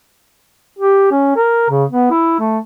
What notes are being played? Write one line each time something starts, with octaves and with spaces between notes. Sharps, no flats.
G4
C#4
A#4
C#3
B3
E4
A3